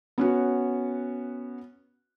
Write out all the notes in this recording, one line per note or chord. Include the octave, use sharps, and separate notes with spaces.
B3 C#4 F#4